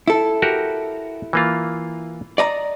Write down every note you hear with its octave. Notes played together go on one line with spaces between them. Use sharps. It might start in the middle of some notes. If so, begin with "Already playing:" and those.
E4 A4
F#4 G4 A#4
E3 A#3 F4
D5 D#5 A#5